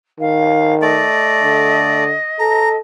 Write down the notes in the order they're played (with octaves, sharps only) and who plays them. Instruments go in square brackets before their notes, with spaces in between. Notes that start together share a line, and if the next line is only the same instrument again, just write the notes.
[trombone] D#3 [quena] F5
[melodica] A3 D5 [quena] D#5
[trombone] D3
[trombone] A4 [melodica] A#5